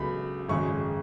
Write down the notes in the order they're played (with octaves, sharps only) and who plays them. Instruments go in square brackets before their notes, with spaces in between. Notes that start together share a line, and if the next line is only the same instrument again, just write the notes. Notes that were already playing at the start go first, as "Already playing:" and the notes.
Already playing: [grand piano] C#2 C#3 F#3 B3 B5
G#1 F#2 C#3 G#3 C#6